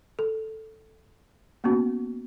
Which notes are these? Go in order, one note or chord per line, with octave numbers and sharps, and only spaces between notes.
A4
A#3 B3 C#4 F#4